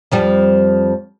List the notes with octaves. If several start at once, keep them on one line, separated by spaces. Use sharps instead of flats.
F2 F3 G3